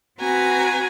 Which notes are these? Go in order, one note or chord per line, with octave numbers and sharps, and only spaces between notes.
C4 F#4 B4 G#5 A#5